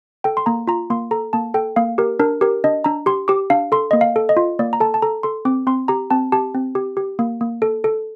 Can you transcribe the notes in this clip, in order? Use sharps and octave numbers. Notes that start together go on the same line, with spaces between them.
A4 G5
C6
A#3 A#5
F4 A#5
A#3 C6
A4 A#5
A#3 A5
A4 G5
A#3 F5
G4 A#4
D4 A#4
G4 A#4
D4 D#5
D4 A#5
G4 C6
G4 D6
D4 F5
A4 C6
A#3 D#5
F5
A4
D#5
F4
A#3 D5
A#5
A4 A5
A5
A4 A#5
A4 C6
C4 D6
C4 C6
G4 A#5
C4 A5
G4 A5
C4
G4
G4
A#3
A#3
A4
A4